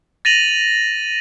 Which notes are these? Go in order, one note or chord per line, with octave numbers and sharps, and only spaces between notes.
A6 A#6 D#7 F7 F#7